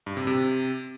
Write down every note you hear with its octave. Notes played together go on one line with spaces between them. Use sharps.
G2
C3
C3